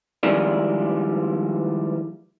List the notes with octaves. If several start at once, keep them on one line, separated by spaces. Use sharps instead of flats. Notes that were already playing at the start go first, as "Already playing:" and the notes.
D#3 F3 G3 G#3 E4 D5